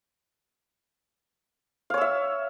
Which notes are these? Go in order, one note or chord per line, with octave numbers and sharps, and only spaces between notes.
C#5 E5 F5 E6